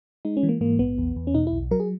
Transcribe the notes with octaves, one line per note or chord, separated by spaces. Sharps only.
G#3 D#4
C#4
E3
A#3
G#2 A#3
A#1 B3
E2
E2
C#4
B2 D#4
E4
B1
F#3 A#4
G#4